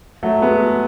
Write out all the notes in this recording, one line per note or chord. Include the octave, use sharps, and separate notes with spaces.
F#3 A3
G#3 B3